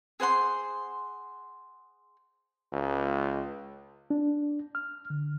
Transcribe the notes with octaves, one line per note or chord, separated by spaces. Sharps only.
G#4 C5 F#5 C6
C#2
D4
F6
D3